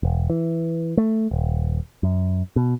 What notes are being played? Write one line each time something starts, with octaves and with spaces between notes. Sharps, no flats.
E1
E3
A3
D#1
F#2
B2